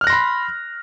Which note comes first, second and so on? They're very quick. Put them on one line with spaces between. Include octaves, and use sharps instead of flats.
F6 F#6 A#6 C6 B5